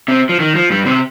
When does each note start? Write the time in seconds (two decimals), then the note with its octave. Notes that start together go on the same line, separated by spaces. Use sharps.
0.08 C3 C4
0.29 F3
0.40 D#3
0.55 F3
0.70 G2 G3
0.86 C3 C4